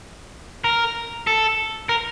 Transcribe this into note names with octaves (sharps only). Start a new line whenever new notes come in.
A#4
A4
A#4